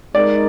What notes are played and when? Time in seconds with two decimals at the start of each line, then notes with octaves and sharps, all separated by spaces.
0.14 G#3 D#4 A#4 D5